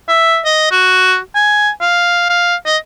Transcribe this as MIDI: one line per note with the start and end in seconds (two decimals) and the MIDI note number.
0.09 0.40 76
0.45 0.71 75
0.71 1.18 66
1.35 1.70 80
1.81 2.28 77
2.30 2.56 77
2.66 2.77 75